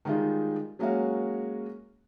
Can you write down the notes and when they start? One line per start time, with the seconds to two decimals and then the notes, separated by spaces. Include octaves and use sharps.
0.05 D#3 G3 G#3 D#4 F4
0.79 F#3 G#3 A#3 C#4 F#4 F5